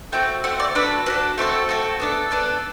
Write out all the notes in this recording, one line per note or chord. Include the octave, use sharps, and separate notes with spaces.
A3 C4 F#4 G5
A3 C4 F#4 F#5
D5
D4 F#4 A4 B4
D4 F#4 A4 B4
A3 C4 F#4 A4
A3 C4 F#4 A4
B3 D4 A4
B3 D4 A4